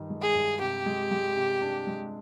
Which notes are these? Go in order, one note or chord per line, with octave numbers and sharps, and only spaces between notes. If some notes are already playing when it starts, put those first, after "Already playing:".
Already playing: G2 D#3 D#4
G#3
G#4
G2
C3 G4
G#3
G#3
C3
D4
G#3